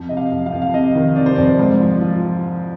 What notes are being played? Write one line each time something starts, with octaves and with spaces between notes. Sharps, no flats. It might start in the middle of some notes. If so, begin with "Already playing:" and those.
Already playing: F2
C3 D#5
F5
F2
F5
F2
F5
C3 D#5
D#3
C3 D5
C5
F2 D5
G#2
F3
F3